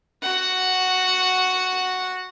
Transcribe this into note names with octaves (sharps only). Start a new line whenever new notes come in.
F#4 F#5